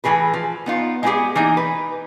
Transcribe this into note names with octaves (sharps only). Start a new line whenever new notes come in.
A2 D#3 E3 G#4 B4
F3
B3 D#4 F4
G#3 B3 D#4 E4 G4 G#4
E3 A#3 D#4 D#5
B4